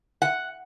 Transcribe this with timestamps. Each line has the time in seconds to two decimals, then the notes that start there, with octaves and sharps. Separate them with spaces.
0.22 F#5